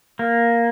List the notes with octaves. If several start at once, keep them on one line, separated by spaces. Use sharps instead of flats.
A#3